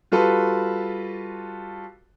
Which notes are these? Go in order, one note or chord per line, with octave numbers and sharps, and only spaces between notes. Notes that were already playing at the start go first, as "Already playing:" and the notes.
G3 F4 F#4 A4 B4